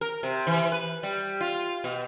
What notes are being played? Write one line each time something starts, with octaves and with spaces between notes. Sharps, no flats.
A#4
C3
E3
B4
G3
F4
B2